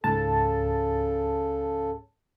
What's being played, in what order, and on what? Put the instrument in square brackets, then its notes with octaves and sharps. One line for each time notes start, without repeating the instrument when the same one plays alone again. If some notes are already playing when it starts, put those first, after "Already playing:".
[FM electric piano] C#2 G#2 A5 [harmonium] C#3 A4